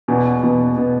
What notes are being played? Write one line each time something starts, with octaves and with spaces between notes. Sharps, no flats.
E2 B2 B3
E2 B2 B3
B2 B3